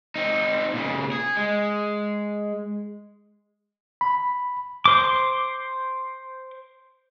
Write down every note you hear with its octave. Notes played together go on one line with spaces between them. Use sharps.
C4 D#4
A#2 C#3
G#4
G#3
B5
C5 D6